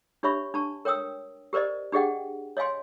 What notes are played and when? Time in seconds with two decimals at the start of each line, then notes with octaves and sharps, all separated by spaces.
0.23 D4 G4 C#5 E5 B5 C#6
0.54 D4 A5 C#6
0.85 A#4 C#5 G5 D#6 E6
1.53 G4 A#4 C5 D5 D#5
1.92 D4 G4 G#4 D#5 F#5 G5
2.57 C#5 D#5 F5 G#5 C6